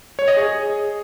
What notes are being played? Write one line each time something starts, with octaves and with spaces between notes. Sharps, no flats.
C#5
D#5
G#4